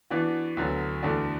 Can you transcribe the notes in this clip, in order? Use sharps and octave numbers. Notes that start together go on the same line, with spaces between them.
E3 B3 D4 F#4
D2 D3 F#3 B3
E2 D3 A3 D4 F#4